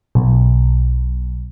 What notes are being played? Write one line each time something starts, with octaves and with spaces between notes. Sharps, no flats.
B1